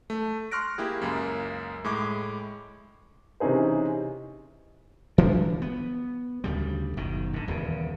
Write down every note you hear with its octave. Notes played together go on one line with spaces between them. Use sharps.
A3
C6 C#6 F6 F#6 A#6 D7
A#3 E4 G4 G#4
C#2 F#2 A#3
A2 G#3 E4 D6
C3 E3 C#4 D#4 G#4 C5
E3 D4
B3
D2 C#3 G3
F#1 B2 D#3
G#2 D3
D#1 E2 C#3